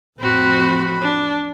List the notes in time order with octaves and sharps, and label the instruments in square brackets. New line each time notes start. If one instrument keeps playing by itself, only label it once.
[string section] A1 F2 B5 [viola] C4 F#4
[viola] D4